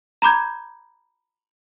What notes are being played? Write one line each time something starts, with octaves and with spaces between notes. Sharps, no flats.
A#5 B5 D6 G6 G#6